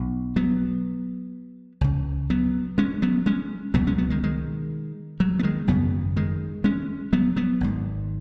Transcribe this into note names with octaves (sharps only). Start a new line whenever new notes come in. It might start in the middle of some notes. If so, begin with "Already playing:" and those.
Already playing: B1 B2
F#3 B3
C#2 C#3
F#3 B3
G#3 C#4
F#3 B3
G#3 C#4
C#2 B2 F#3 B3
G#3 C#4
F#3 B3
D#3 G#3
D#3 G#3
F#3
B3
D#3 G#3
G#1 F#2 C#3 F#3 B3
D#3 G#3
G#3 C#4
F#3 B3
F#3 B3
G#1 G#2